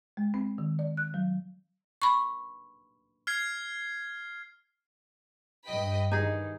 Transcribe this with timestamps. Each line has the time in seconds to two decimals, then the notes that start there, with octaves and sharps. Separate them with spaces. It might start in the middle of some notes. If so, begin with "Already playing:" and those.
0.17 G#3
0.34 C4
0.58 D#3
0.79 D5
0.97 F#6
1.14 F#3
2.02 B5 C#6
3.27 F6 G#6 C7
5.67 G2 D#5 G5 B5
6.12 D#3 E3 D#4 G#4